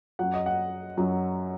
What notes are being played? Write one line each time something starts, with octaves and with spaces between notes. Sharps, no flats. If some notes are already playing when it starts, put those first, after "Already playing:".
F#2 F#3 F#5
D#5
F#5
F#2 F#3